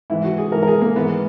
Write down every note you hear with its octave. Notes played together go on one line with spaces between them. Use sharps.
G#2 E3 E4
F#4
G#4
G#2 E3 A#4
A#4
G#4
A#3
G#2 E3 B3